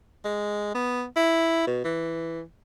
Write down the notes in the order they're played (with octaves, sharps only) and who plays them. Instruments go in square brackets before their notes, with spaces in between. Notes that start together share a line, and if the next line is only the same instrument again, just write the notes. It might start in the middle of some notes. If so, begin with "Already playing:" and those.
[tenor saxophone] G#3
B3
E4
B2
E3